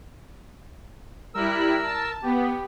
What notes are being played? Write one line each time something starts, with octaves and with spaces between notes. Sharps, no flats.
G3 E4 A#4 E6 F#6
A5
B3 G4